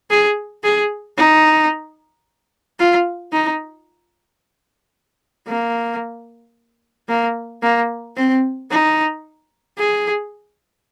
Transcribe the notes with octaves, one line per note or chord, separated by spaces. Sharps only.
G#4
G#4
D#4
F4
D#4
A#3
A#3
A#3
C4
D#4
G#4